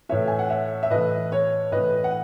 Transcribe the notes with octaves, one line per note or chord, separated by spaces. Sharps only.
A2 E3 C#5 E5
G#5
F#5
C#5 E5
E5
A2 E3 B4 D#5
C#5
A2 E3 B4 D#5
F#5